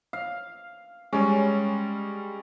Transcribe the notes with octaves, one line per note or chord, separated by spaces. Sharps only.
F5
G3 G#3 C#4